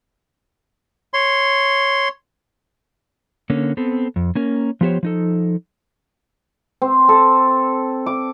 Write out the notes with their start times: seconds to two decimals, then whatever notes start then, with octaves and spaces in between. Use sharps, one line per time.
1.14 C#5 C6
3.50 D3 A#3 C#4
3.77 B3 C4 A4
4.16 F2
4.35 A#3 C#4 A#4
4.81 F3 B3 G4 C5 C#5
5.03 F3 D#4 A4
6.82 C4
7.09 A4
8.06 D6